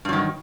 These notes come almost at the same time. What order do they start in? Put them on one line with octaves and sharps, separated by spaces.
G2 F#3 D#3